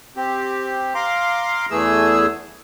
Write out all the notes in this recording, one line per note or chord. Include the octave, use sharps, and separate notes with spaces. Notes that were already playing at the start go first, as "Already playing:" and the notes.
C4 G4
F5 A#5 C6 D6
E2 E3 A3 G#4 E6